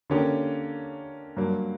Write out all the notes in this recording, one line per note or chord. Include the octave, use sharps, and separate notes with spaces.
D3 A#3 C#4 G4
G2 F#3 A#3